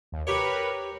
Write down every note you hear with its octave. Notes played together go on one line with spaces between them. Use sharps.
D#2
G4 A#4 B4 C#5 B5